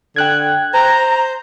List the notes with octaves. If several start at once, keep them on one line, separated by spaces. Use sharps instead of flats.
D3 G5 F#6 G#6
C5 A#5